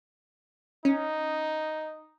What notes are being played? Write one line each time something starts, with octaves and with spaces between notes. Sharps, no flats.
C#4 D#4